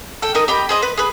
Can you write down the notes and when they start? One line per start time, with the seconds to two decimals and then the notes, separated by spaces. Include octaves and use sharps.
0.22 A4 G5
0.35 D#4 A#4 D#5
0.48 G4 D#5 G5 B5
0.69 G#4 C5 D#5
0.82 B4
0.97 G#4 B4